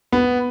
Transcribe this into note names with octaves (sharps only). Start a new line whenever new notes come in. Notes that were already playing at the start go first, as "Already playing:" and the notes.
B3